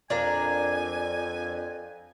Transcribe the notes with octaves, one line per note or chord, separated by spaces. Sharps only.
F2 D4 A#4 F5 G#5